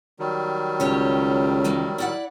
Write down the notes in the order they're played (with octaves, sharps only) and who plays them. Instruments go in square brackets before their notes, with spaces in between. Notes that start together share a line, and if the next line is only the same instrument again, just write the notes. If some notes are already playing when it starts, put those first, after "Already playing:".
[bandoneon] D#3 F#3 G3
[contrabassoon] C#2 [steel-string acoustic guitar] G4 C#5
[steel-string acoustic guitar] E3 G#3 A#3
E4 D5 F#5